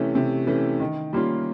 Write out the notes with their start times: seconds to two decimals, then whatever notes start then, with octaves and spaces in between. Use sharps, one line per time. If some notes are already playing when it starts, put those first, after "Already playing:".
Already playing: C3 E3 A3 C#4
0.15 C3
0.47 E3 A3 C#4
0.80 D#3
1.13 G3 A#3 C#4 F4